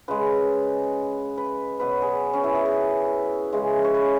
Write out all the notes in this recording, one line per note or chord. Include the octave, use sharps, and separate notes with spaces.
C#3 G#3 B4
B4
B2 F#3 B4
G#4
C#4
E4
G#4
B4
C#3 E3 G#3
C#5
B4